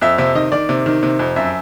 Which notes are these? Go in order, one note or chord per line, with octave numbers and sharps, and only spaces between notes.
F2 E5
C3 E5
D#3 D#5
D#3 D5
C3
D#3
C3
F2
F#2 E5